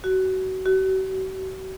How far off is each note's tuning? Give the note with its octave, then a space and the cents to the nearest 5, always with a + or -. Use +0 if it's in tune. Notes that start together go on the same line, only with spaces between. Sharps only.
F#4 +25
F#4 +45